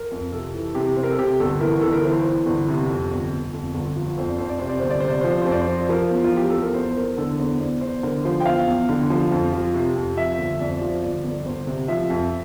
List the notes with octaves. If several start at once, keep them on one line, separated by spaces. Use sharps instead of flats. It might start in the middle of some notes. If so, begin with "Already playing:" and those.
Already playing: A#4
F2
C3 A4
E3
C3 G4
C3 C5
A#4
A4
C3 G4
G1 A4
E3 A#4
G1 A4
A#4
E3 C5
E3
G1
C3
F2
G1
G1
F2
G1
F3
F2 C5
D5
F2 C5
D5
C3 C5
D5
G1 C5
D5
C3 C5
D5
F3 C5
D5
F2 C5
D5
C5
F3
F3 A#4
E2
F4
F3
G4
E2 A4
A#4
E2 C5
E2 A#4
D3 A4
E2 C5
E2 D5
E2 C5
D3 A#4
F3 C5
G5
E2 F5
E2
D3
F3
F2
F3
C3
F2
F3 E5
G1
F2 D5
C5
F3 D5
G1 D5
G1
D5
G1 C5
C3
F3 E5
F2